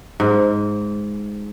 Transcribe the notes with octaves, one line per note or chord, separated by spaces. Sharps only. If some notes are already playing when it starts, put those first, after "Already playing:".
G#2